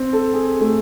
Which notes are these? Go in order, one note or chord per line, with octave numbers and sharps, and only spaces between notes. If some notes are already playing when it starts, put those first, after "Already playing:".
Already playing: C4
A4
G#4
A3